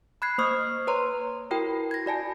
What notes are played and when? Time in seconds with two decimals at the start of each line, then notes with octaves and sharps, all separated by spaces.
0.22 B5 F#6 G#6 C7
0.38 A#3 C5 C#6 D#6 F6
0.87 B4 C#5 A#5 C6
1.51 E4 F#4 A#4 G5
1.91 G#6 A#6
2.06 F#4 D5 G#5 A5